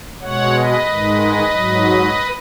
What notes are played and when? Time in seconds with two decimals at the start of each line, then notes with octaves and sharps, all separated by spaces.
0.21 B2 G#3 C#5 F#5
0.54 B4 D#5
0.88 G#2 D#3 G#3
1.53 G#2 F#3